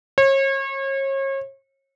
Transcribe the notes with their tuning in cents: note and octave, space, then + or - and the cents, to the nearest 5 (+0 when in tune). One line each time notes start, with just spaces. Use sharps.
C#5 -35